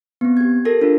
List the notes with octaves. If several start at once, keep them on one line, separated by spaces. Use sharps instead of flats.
B3 C4
G4 G#6
G4 A4 A#4 A#6
D4 F4 A#4